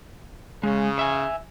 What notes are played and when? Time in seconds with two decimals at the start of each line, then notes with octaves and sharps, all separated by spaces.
0.63 C#3 G#3
0.99 E5 G#5